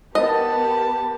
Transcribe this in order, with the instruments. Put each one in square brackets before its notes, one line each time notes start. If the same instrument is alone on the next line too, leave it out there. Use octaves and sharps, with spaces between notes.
[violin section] B3 G4 B4 [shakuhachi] A#4 [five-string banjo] D#5 [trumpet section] A5